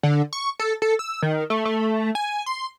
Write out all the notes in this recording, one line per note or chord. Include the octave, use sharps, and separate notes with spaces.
D3
C#6
A4
A4
E6
D#3
A3
A3
G#5
C6